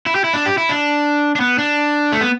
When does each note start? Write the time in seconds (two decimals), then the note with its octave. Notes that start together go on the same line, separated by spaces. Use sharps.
0.06 E4
0.15 G4
0.24 E4
0.34 D4
0.46 G4
0.58 E4
0.69 D4
1.36 D4
1.40 B3
1.58 D4
2.12 A3
2.21 B3